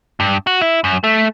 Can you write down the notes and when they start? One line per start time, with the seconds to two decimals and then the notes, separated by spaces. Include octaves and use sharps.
0.20 G2
0.47 F#4
0.61 E4
0.84 F#2
1.04 A3